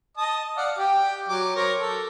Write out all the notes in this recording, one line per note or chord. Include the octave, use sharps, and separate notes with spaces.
D#5 A5 D#6
D5 F5 F#5
G4 G5
F#3 D6
A#4 C5 C#5
A4